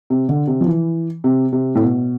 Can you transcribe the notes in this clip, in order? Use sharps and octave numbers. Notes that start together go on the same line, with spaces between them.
C3
D3
C3
F3
E3
C3
C3
A2
B2